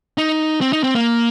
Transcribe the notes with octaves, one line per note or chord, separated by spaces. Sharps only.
D#4
C4
D#4
C4
A#3